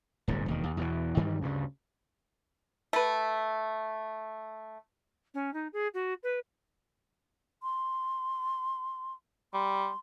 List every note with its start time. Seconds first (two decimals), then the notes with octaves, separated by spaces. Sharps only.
0.28 D1 G1 G#2 C3
0.46 E1 D#2 D#3
0.64 D#2
0.77 E2 B2 E3
1.17 G2 D#3 E3 G3
1.41 D2 G2 C#3
2.93 A3 B4
5.34 C#4
5.53 D#4
5.73 G#4
5.94 F#4
6.23 B4
7.62 C6
9.54 G3 C6